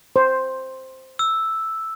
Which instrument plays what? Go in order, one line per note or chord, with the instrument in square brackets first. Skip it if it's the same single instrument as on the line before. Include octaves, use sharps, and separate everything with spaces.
[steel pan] C5
[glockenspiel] E6